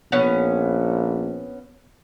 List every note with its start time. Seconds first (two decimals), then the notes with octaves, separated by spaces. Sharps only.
0.12 A#1 B3 C#4